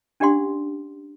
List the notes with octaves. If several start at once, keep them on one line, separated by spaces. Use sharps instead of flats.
C#4 D4 G4 D5 F#5 C6